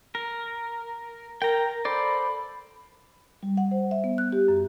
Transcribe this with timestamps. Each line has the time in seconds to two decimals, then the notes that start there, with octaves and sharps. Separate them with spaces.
0.15 A#4
1.42 A#4 G5 A#5
1.85 A4 C5 D5 B5
3.43 G3
3.57 F#5
3.71 C5
3.91 E5
4.04 B3
4.18 F#6
4.33 G4
4.48 F#2